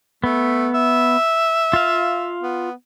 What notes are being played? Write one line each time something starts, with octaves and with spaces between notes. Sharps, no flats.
A3 B3
E5
F4 F5
B3